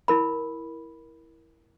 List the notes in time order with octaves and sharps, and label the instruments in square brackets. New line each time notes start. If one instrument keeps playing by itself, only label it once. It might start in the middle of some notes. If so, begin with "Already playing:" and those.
[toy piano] E4 A#4 B5